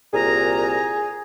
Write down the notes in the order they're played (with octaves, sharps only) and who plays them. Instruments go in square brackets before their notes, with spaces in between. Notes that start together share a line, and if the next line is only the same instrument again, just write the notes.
[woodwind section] C2 A#2 A#5 [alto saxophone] G#4